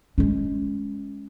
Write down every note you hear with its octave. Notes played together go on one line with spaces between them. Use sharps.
G#3 C#4